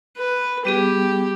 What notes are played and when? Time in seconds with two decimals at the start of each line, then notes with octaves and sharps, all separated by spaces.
0.17 B4
0.65 G3 B3 G4 G#4